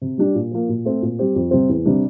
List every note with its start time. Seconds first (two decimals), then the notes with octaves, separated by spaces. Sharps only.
0.01 C3
0.18 G3 D4 G4
0.35 A#2
0.51 F3 A#3
0.69 A#2
0.85 A3 C4
1.02 A#2
1.19 G3 C4 G4
1.35 F2
1.51 C3 G3 C4
1.69 E2
1.85 C3 G3 D4